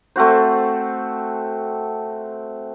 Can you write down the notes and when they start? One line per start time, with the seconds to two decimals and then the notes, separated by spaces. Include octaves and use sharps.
0.16 A3 C4 F#4 C5